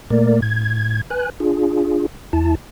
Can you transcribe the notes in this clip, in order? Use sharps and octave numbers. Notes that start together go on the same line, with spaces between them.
A#2 A3 A#3 A#4 D5
A2 G#6
B4 G#5 F#6
D4 F4 G#4
E2 E4 A5